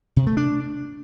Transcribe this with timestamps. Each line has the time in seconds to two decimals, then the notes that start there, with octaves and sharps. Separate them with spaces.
0.16 C3
0.27 A3
0.37 D4